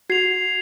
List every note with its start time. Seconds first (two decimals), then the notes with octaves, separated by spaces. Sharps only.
0.10 F#4 G#6 C7 F7